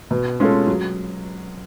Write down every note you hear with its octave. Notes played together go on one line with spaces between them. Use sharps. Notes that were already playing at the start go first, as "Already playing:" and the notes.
B2
G#3 C#4 F4 A4
F#3